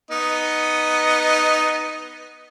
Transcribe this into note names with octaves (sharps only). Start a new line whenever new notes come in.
B3 D#4 D#5